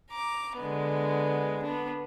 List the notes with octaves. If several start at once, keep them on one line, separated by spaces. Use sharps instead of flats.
A#5 D6
D3 G#3 B3
B3 D4